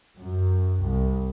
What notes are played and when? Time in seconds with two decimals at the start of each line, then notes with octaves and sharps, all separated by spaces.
0.16 F#2
0.81 C2